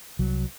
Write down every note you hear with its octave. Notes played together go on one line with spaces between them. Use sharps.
C2 F#3